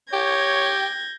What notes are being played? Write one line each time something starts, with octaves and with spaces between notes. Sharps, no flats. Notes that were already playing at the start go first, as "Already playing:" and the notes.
G4 C#5 G6 G#6 A#6